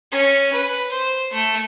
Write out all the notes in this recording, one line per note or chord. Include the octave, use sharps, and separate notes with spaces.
C#4
B4
C5
A3